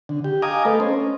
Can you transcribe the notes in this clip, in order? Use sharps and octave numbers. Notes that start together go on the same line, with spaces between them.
D3
G4
D#5 F5 G#5 A#5 D6 D#6
A3 A4 B4 D#5
C#4 C5
C#4